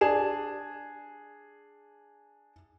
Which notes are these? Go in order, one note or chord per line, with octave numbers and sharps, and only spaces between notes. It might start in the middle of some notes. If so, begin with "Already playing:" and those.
D4 G#4 E7